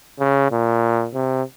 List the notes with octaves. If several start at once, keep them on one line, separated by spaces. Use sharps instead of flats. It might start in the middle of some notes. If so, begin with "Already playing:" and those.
C#3
A#2
C3